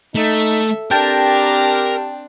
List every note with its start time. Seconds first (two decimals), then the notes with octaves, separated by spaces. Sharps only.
0.15 A3 D#4 A4 E5
0.91 C4 D4 G4 A#4 G5 A5